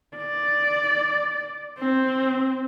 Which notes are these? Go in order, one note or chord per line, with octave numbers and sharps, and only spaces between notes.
D5
C4